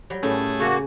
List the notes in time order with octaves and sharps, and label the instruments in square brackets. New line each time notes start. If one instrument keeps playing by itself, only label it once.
[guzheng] F#3 G3
[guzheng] A2 G3 A#3 [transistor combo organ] A3 G#4 [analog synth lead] C#4
[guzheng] C#3 C#5 G#5 [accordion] A#3 F#4